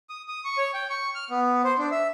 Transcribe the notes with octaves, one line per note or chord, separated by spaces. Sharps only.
D#6
D#6
C#6
C#5
G5
C#6
F6
B3
C5
D4
E5